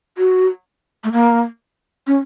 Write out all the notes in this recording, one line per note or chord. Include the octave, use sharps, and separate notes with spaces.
F#4
A3
A#3
C#4